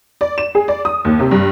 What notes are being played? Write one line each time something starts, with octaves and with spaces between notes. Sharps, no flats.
D5
E7
G#4
D5
D#6
D#2
C3
G2